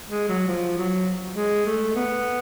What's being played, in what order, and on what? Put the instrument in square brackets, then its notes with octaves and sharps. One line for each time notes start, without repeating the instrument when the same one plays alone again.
[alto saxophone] G#3
F#3
F3
F#3
G#3
A3
B3